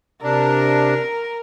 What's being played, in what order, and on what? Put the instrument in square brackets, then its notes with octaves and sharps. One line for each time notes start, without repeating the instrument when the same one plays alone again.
[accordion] C3 D4 [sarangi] A#4